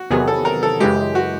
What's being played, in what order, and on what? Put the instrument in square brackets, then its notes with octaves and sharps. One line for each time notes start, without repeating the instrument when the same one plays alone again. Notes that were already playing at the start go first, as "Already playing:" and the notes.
Already playing: [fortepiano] F#4
[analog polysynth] E2 C3 D#3 F#3 B3 [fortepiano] G#4
[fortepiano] A4
A#4
A4
[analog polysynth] F#2 C#3 E3 G#3 [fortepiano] G4
[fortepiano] F#4